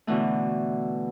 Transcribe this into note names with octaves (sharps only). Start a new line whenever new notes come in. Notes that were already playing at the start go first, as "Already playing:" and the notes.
B2 D3 E3 A3